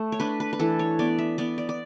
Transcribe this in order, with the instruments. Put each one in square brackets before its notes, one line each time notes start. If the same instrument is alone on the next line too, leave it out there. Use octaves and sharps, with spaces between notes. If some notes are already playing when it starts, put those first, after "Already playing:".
Already playing: [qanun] A3
C#5
D4 B4
B4
B4
E3 A4
C#5
B3 D5
E5
B3 D5
D5
D5